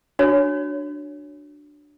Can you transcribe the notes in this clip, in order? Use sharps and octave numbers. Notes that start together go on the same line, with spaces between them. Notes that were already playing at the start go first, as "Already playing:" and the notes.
D4 F#4 C#5